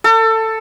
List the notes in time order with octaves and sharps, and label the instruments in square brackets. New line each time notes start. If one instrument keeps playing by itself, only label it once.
[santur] A4